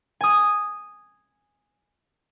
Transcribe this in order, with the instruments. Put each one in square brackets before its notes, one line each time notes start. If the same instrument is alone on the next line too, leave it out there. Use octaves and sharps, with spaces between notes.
[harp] G#5 D#6